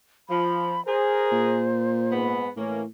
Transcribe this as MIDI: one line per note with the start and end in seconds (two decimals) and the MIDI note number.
0.29 0.77 53
0.29 0.84 83
0.86 1.68 68
0.86 1.68 70
0.86 2.14 72
1.32 2.42 46
2.10 2.48 44
2.10 2.48 59
2.10 2.48 83
2.56 2.86 45
2.56 2.81 52
2.56 2.81 58
2.56 2.81 61